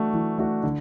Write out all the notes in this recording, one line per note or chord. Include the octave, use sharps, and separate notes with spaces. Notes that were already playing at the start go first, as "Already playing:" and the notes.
Already playing: E3 A3 D4 F#4
E3
A3 D4 F#4
D3